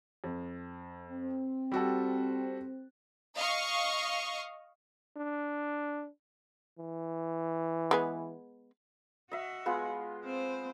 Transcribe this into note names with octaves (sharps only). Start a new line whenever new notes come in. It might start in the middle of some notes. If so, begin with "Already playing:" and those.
F2
C4
G3 F#4 A4
D#5 F5 C#6
D4
E3
G#3 B3 G#4
F#4 D#5 E5
G#3 B3 F4
C4 C5